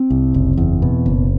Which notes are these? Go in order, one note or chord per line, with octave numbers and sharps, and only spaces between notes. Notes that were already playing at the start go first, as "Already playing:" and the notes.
Already playing: C4
C2
F#1
E2
B2
F#1